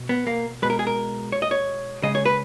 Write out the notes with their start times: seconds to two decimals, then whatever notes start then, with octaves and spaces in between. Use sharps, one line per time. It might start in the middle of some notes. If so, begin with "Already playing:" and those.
Already playing: B2
0.09 B3
0.27 A#3
0.62 B2 G#3 B4
0.70 A#4
0.79 G#4
0.87 A#4
1.32 C#5
1.42 D#5
1.51 C#5
2.03 C#3 G#3 D#5
2.15 C#5
2.25 B4